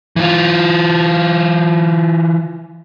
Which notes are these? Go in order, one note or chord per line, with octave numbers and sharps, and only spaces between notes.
E3 F4